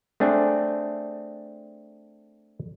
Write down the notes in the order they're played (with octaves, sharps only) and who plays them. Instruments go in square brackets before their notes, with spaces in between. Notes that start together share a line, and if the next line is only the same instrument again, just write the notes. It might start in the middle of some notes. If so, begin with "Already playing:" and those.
[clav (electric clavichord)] A3 C4 D4 G#4